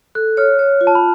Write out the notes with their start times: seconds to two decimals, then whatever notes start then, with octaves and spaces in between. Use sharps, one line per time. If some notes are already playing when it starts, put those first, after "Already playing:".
0.15 A4 F#6
0.37 C#5 F6
0.59 C#5
0.81 F4
0.87 A5
0.95 B5